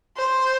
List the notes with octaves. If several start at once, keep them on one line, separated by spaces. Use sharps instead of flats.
C5